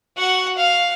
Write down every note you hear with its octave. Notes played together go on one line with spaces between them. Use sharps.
F#4 F#5
F5